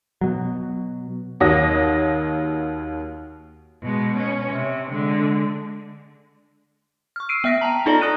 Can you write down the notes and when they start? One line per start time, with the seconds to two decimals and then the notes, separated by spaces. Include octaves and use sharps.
0.21 B2 F#3
1.40 D#2 F#4 C#5 D#6 A#6
3.83 B2 G#3
4.18 C#4
4.50 C3
4.91 D3 G#3
7.16 C#6 F6
7.29 E6 C7 D7 D#7
7.44 B3 E5 F6 A#6 B6
7.61 G5 A5 A#5
7.86 D#4 F4 A4 D5 D#5 A#5
8.01 D5 D#6 F#6 D#7